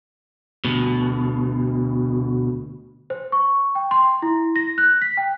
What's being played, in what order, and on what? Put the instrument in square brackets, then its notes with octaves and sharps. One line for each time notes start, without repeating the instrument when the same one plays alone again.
[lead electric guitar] D2 B2
[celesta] C5
C#6
G5
C6
E4
A#6
F#6
B6
G5